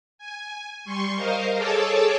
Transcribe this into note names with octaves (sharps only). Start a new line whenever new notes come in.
G#5
G3 C6 C#6
A#4 C5 D#5 F5
G#4 A4 C#5 A5 D6 E6